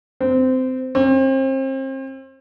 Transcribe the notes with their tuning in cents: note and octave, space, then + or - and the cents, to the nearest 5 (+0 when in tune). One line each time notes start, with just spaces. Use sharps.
C4 -20
C4 +35